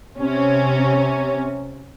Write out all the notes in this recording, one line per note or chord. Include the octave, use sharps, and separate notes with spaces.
C3 C#4